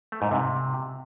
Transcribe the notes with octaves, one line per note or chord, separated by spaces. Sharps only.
A3
G#2
C3